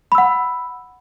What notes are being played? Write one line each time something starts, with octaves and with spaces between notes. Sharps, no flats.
F#5 B5 E6